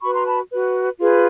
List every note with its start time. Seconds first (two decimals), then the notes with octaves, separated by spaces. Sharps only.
0.02 F#4 B4 B5 C#6
0.14 A#5 C6
0.26 A5 B5
0.51 F#4 B4
0.99 F4 G#4 B4